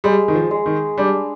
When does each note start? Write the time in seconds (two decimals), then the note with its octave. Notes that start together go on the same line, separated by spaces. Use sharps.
0.04 G3 G#3
0.28 D#3
0.35 F3
0.51 G#3
0.66 D#3
0.97 G3 D4